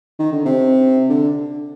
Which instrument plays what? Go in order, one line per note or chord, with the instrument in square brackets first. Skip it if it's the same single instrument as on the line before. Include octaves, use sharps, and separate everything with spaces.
[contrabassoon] D#3
D3
C3
D3